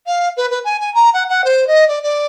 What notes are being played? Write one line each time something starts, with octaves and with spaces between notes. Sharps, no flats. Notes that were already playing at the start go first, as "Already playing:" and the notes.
F5
B4
B4
G#5
G#5
A#5
F#5
F#5
C5
D#5
D5
D5